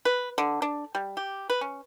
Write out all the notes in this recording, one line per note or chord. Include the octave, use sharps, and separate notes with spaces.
B4
D3
D4
G3
G4
B4
C#4